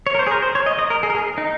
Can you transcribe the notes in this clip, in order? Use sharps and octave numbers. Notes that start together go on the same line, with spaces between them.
C#5
A#4
C5
G#4
A#4
C5
C#5
D#5
D#5
A#4
G#4
A#4
G#4
D#4